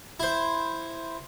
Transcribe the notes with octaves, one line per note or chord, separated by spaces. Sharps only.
E4 C5